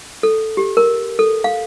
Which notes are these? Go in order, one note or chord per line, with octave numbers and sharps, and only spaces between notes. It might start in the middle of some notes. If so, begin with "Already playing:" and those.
A4
G4
A#4
A4
F5